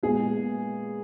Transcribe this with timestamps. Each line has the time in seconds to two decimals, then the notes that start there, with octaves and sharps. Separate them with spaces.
0.03 A#2 G#3 B3 G#4